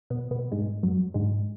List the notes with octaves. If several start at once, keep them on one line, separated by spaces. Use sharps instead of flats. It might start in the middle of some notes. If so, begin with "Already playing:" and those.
B2 B3
B2 B3
G#2 G#3
F#2 F#3
G#2 G#3